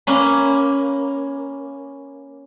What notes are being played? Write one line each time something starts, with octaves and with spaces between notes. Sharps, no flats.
A#3 C#4 B4